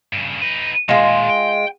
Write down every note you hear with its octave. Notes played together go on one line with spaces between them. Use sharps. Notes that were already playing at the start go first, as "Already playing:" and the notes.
G2 C#3
D#4 B4
A#2 D#3 G#3 F4
G5